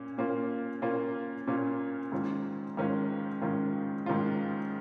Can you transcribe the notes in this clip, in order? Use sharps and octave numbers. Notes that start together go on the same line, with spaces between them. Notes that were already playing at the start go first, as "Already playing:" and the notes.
Already playing: A#2 A#3 C#4
A#2 A#3 C#4 F4
A#2 A#3 C#4 F4
A#2 A#3 C#4 F4
G#2 D#3 C#4 F4
G#2 D#3 C#4 F4
G#2 D#3 C#4 F4
G#2 D#3 C#4 F4